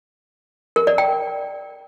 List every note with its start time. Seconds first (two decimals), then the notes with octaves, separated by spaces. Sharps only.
0.76 A#4
0.87 D5
0.98 G5